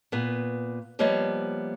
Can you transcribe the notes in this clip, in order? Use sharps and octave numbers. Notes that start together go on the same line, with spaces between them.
A#2 B3
F3 G3 A#3 B3 C#5 D#5